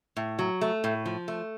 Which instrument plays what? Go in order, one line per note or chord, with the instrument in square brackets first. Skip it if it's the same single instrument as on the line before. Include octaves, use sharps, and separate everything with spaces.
[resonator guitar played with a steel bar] A2
F#3
A3
A2
F3
A3